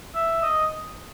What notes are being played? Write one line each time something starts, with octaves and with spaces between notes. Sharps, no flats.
E5
D#5